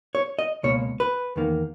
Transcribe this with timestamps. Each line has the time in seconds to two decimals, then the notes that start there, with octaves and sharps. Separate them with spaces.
0.15 C#5
0.39 D#5
0.63 C#2 B2 A#3 C#5
1.00 B4
1.36 E2 D#3 A#3